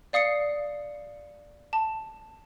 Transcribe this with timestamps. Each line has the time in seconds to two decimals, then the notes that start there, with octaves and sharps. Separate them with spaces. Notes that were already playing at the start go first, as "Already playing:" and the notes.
0.13 D5 F5 D#6 C7 C#7
1.73 A5